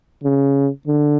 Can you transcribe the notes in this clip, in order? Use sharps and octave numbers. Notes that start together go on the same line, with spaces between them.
C#3
D3